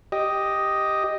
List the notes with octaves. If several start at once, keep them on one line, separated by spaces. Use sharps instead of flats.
G4 D#5